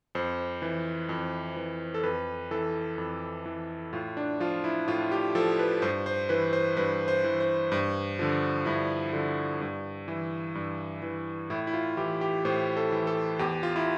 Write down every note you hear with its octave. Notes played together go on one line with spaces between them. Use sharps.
F2 C5
E3
F2
E3
A4
F2 B4
E3 A4
F2
E3
A2 F4
D4
F3 F4
E4
A2 F4
G4
F3 A4
B4
G2 C5
C5
E3 B4
C5
G2 B4
C5
E3
C5
G2
D3 F3
G2 E4
D3 F3
G2
E3
G2
E3
A2 E4
E4
F4
E3 G4
G4
A2 C5
A4
E3
A4
E2 G4
F4
E4